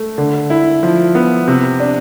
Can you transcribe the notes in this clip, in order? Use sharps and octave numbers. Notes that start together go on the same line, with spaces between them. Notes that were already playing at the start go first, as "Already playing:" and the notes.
Already playing: A3
D3
E4
F3
B3
C3
D4